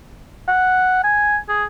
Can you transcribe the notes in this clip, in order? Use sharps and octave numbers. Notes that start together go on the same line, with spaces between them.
F#5
G#5
G#4